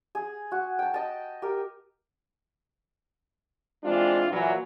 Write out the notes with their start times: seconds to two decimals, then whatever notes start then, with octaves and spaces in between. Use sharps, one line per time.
0.15 G#4
0.52 F#4
0.79 G5 A5
0.94 D#5 A5
1.42 G4 A#4
3.83 E3 G#3 C4 D4 F4
4.31 A#2 E3 F#3